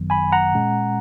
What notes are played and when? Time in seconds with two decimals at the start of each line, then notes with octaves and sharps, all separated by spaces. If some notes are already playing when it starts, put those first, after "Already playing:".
Already playing: G#1 F#2 D#3 F#3 B3
0.10 G#5 B5
0.32 F#5 A#5
0.54 A#2 G#3 C#4